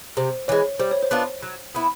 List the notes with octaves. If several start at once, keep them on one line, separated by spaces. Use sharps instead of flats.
C3 C5
E3 G#3 C#5
G3 C5
C#5
C5
B3 D4 F4
F#3
B3 E4